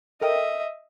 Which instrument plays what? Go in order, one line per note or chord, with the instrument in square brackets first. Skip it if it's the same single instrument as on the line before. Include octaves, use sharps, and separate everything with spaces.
[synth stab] A4 A#4 G5 [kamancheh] D#5 E5